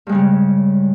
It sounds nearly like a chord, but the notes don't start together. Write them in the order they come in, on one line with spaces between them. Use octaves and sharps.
G2 G#3 C#3 G3